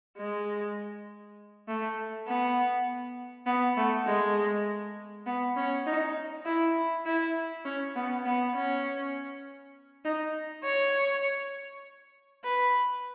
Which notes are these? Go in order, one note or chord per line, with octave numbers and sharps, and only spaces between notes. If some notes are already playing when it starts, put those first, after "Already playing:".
G#3
A3
B3
B3
A3
G#3
B3
C#4
D#4
E4
E4
C#4
B3
B3
C#4
D#4
C#5
B4